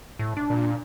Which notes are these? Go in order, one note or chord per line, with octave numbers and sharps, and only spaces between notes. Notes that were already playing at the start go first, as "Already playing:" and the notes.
A2
D4
A#2